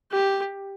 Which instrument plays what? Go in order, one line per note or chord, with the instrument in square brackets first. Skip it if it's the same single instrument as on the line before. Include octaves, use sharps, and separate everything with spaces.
[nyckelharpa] G4